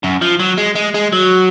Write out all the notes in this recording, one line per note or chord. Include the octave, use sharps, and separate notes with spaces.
F#2
F3
F#3
G#3
G#3
G#3
F#3